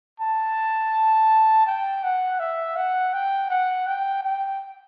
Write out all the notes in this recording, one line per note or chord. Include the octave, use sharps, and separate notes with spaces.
A5
G5
F#5
E5
F#5
G5
F#5
G5
G5